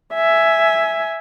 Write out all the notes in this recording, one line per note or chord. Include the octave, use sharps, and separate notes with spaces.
E5 G#5